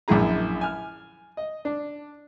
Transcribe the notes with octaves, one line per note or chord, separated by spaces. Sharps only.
A#1 F#2 F#3 E4 G#4 A#5
G#5 F6
D#5
D4